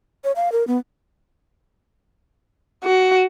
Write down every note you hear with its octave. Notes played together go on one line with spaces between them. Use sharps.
C#5
F5
A#4
B3
F#4